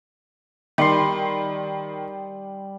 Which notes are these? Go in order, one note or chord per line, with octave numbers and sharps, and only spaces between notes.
D#3 G3 C6